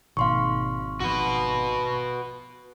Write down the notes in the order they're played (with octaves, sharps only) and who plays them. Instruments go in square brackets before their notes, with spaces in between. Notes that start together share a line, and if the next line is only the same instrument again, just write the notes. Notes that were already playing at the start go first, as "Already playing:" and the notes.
[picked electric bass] G#1 [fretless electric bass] B2 F3 A#3 [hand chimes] F5 C6 C#6
[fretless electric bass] B1 G#2 F3 [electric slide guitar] F#4 B4